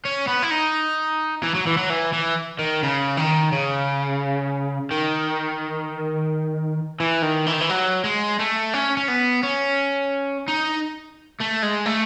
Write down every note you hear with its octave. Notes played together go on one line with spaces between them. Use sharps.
C#4
B3
E4
D#4
E3
F#3
E3
F#3
E3
E3
D#3
C#3
D#3
C#3
D#3
E3
D#3
E3
D#3
E3
F#3
G#3
A3
C#4
C#4
B3
C#4
D#4
A3
G#3
A3